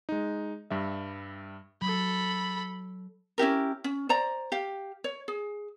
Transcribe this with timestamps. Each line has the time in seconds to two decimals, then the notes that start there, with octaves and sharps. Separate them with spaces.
0.09 G#3 D#4
0.70 G2 G3 E5
1.82 F#3 A4 B5
3.38 C#4 E4 G4 A#4
3.84 C#4
4.09 C5 D5 A#5
4.52 G4 F5
5.04 C#5
5.28 G#4